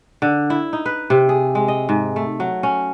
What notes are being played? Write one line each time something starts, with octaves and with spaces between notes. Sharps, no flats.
D3
E4
D#4
B4
C3
G#4
G#3
D#5
G#2
A3
F#3
C#4